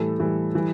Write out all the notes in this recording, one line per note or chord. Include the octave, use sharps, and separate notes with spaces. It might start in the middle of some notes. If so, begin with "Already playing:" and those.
Already playing: A2 E3 G3 A4
A2 E3 G3
E3 G3